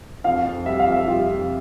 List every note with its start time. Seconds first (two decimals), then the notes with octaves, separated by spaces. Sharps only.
0.24 F2 F5
0.45 F2
0.66 G3 E5
0.79 F5
0.87 F2
0.92 E5
1.07 G3 F4
1.28 F2